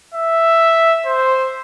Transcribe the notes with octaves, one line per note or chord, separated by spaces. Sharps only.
E5
C5